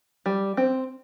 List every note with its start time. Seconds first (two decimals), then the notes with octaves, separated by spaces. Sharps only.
0.26 G3
0.57 C4